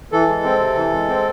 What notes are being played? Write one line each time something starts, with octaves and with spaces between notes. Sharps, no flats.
E3 A4
G#3
C4
C3
E3
G#3
C4